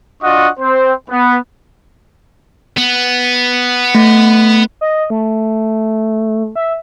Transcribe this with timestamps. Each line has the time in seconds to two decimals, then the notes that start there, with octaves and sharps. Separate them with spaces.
0.23 D4 F4 F#4 D#5 F#5 C#6
0.60 C4 C5
1.10 B3
2.77 B3
3.95 A3
4.81 D#5
5.10 A3
6.55 E5